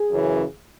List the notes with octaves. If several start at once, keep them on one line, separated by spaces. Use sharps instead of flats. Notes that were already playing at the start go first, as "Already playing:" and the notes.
Already playing: G#4
F#2 C#3 E3